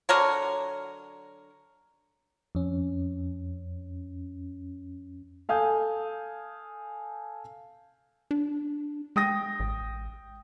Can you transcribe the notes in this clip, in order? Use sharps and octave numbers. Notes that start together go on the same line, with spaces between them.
D3 F#3 A#4 C#5
F2 C#4
A4 F5 G#5 D#6 G6
D4
G#3 G5 D#6 A#6
A1